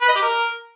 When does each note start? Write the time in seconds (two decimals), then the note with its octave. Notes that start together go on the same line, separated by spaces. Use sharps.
0.02 B4
0.08 D#5
0.15 G4
0.22 A#4